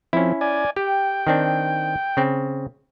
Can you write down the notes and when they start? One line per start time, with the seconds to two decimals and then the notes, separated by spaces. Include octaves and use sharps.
0.13 F3 C4 C#4 E4
0.41 D5 G#5
0.76 G4 G5
1.27 D#3 C4 D4
2.17 C#3 C4